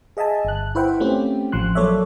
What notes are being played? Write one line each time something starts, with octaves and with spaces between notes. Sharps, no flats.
G#4 D#5 E5 G#5 A5
G1 F#6
E4 B4 C5 E5 F#5 G5
A3 C4 C#4 F4 G4
A1 F3 C6 F#6
F#3 A#3 A4 C#5 D5 E5